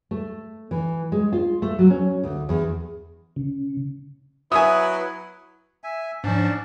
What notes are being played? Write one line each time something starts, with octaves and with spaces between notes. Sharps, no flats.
A3
E3
G#3
F4
A3
F#3
C#4
D2
E2
C#3
F#3 B3 E4 B4 E5 G#5 D#6
E5 G#5
G#2 F3 C#4 D4 A5